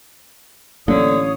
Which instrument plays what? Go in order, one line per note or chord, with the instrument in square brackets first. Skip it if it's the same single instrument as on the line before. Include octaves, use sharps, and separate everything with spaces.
[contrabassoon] A1 [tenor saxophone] D3 [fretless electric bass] F#3 A#3 D4 [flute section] C#5 F5 D#6